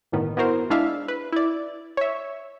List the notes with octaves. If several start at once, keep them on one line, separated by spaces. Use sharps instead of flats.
G1 A2 D#3 B3
B3 E4 F#4 A#4 C5
G#3 D4 E4 E5 F5
B4
E4 D5
C#5 E5